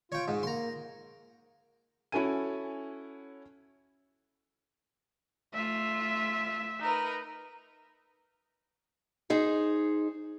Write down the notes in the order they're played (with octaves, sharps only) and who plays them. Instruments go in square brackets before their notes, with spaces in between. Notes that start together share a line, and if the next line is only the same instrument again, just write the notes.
[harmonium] F4 [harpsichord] C#5 G5
[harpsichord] G#2
[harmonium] A#3 [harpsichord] A#5 C6
[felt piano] C#4 E4 F#4 A4 G#5 D#7
[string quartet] A3 F4 [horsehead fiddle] E5
[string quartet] D#4 A#4 B4
[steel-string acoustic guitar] D#4 G#4 C5